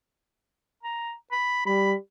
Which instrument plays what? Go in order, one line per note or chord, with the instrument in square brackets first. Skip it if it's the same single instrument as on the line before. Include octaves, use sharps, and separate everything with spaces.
[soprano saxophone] A#5
B5
[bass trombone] G3 [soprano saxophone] B5